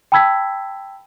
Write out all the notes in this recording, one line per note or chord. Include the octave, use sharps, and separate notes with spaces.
G5 A5 B5 E6 G#6 B6